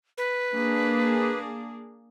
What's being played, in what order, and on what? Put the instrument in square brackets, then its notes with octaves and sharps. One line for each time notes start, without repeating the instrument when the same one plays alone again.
[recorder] B4
[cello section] A#3 D4 G#4